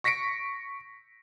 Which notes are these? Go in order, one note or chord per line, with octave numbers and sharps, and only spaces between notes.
C#6 A#6 B6 C#7 D7